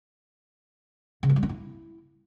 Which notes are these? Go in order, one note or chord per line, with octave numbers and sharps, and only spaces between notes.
C#3
F3
G3
C#4
E4